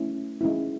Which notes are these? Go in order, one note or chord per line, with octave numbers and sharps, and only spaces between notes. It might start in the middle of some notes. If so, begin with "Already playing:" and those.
Already playing: A3 C#4 E4
G#3 C#4 E4